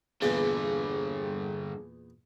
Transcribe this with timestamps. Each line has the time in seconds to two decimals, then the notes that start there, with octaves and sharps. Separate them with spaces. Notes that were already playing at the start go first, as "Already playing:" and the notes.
0.22 E2 G2 A#2 D3 B3 G#4